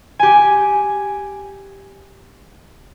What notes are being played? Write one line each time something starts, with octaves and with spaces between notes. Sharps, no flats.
G4 G#5